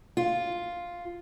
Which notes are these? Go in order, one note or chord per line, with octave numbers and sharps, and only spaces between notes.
F4